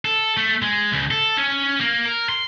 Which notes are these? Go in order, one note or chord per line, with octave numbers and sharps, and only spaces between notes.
A4
A3
G#3
C#2
A4
C#4
A#3
A#4
C6